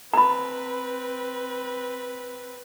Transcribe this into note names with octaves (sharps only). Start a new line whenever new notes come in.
C4 B4 A#5 B5